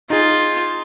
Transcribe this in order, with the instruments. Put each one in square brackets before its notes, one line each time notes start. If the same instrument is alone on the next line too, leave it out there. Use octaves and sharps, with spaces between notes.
[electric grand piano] D#4 G#4 [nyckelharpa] F4